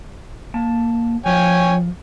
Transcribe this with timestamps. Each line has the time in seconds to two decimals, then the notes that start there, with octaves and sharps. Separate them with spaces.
0.54 A#3 A5
1.26 F3 C#5 G5 G#5